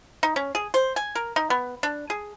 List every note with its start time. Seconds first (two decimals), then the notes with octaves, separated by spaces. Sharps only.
0.23 D#4
0.36 C#4
0.55 G#4
0.74 C5
0.96 G#5
1.15 A#4
1.36 D#4
1.50 B3
1.83 D4
2.10 G#4